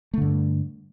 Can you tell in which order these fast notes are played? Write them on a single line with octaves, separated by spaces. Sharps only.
A3 D3 G2